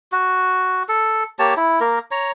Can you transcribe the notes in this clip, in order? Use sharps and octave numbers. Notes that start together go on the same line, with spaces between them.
F#4
A4
A#3 G4 C#5 A5
E4
A#3 A#4
C#5 A#5